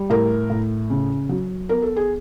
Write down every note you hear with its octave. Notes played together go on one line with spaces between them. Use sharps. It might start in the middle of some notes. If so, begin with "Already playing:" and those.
Already playing: G3
A2 A#4
A2
C#3
F#3
B3 A#4
A4
G#4